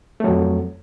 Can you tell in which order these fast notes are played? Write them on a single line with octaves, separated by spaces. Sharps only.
A3 F#3 F2